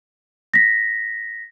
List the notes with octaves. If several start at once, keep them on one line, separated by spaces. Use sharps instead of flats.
A#6 B6